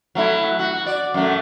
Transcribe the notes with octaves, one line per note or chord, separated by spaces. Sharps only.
F#3 A3 E4
F#4
D5
F#2 F#3 A3